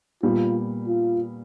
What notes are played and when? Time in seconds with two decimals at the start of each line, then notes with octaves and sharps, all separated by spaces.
0.23 A#2 G3 B3 F4
0.87 F4